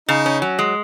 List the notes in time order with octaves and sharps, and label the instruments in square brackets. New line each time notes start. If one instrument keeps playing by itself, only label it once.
[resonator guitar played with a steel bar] C#3 [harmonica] D#4
[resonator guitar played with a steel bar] C#4
F#3
G#3